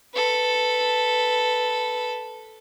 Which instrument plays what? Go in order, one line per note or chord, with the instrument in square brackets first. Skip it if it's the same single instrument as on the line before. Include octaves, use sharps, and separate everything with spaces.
[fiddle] A4 B4